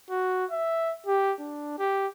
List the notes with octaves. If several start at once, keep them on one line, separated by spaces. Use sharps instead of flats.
F#4
E5
G4
D4
G4